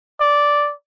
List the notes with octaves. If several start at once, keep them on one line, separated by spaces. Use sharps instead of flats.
D5